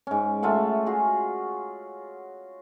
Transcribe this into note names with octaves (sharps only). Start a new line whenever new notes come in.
G#2 C#4
A3 F4 E5 F#5
F4 F#4 G#4